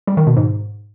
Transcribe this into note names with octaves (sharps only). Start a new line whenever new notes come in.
G3
D#3
B2
G#2